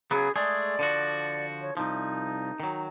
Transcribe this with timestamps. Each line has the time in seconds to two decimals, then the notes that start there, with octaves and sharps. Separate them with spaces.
0.11 C#3 F#3 B3 G#4
0.36 G#3 A3 G#4 D5
0.79 D3 F3 F#4
1.62 C#5
1.77 C2 F3 D#4
2.60 D#3 F#3